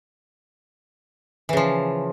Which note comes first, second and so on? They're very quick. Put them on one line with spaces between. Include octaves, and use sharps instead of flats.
E3 C#3 F3